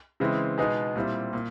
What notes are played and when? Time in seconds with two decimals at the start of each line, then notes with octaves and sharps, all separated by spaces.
0.20 C#3 E3 G#3 C4 E4
0.58 B2 G#3 B3 D#4 G#4
0.96 A#2 G3 C4 E4
1.33 A#2